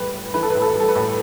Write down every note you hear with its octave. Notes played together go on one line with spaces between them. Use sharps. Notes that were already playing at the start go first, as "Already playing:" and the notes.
Already playing: A2 E3 G3 B4
A2
E3 B4
A4
A2 B4
A4
G3 A4
B4
A2